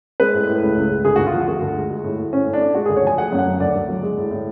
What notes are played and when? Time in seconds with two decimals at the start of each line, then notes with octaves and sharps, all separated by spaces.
0.20 G#3 B4
0.34 A2
0.47 A2
0.62 C#2
0.77 C#2
0.90 G#3
1.05 D2 G#4
1.16 D2 F#4
1.26 F4
1.33 F3
1.48 D2 F#4
1.62 D2
1.76 G#3
1.90 G#3
2.04 A2
2.19 A2
2.33 A2 C#4
2.47 A2
2.53 D4
2.61 A3
2.75 G#3 F#4
2.86 D2 G#4
2.97 C#5
3.04 F3 G#5
3.18 A3 F#5
3.32 F#2
3.39 F#5
3.46 F#3
3.60 D2 D5
3.75 D2
3.89 F#3
4.03 G#3
4.17 A2
4.31 A2